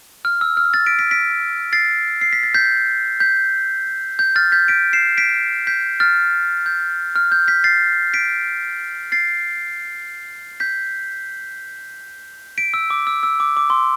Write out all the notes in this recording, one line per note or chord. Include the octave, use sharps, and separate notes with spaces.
F6
E6
F6
F6 A6
B6 D7
B6 D7
B6 D7
A6 C7
C7
B6
A6
G6 B6
G6 B6
G6
F6 A6
G6 B6
B6 D7
C7 E7
B6 D7
G6 B6
F6 A6
G6
F6
G6
G6 B6
A6 C7
B6 D7
A6 C7
G6 B6
B6 D7
E6
D6
E6
E6
D6
D6
C6